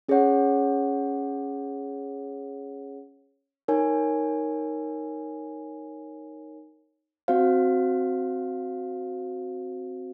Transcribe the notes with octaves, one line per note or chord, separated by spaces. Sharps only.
C#4 G#4 C#5 F#5
D#4 A#4 C#5 G#5
C4 F#4 C5 F5